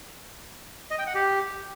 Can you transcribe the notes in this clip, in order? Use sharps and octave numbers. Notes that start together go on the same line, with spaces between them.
D#5
G5
F#5
G4